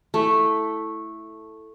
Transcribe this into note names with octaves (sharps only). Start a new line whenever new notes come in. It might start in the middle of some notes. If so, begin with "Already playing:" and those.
A3 E4